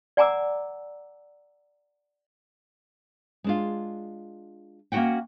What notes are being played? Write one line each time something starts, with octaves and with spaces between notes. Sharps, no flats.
D5 F#5 G#5 A#5 D6 E6
G#3 D4 F4
A#3 C#4 D#4 F#4 F#5 G5